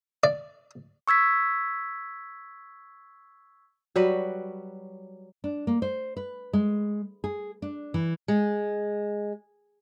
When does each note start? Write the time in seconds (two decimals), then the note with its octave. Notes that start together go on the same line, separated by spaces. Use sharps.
0.24 D5
1.08 C#6 E6 G#6 B6
3.96 F#3 G3 F#4 B4
5.44 D4
5.67 A#3
5.82 C5
6.17 B4
6.53 G#3
7.24 G#4
7.62 D4
7.94 E3
8.28 G#3